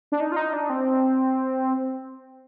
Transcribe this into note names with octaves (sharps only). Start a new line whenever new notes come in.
D4
D#4
F4
D#4
D4
C4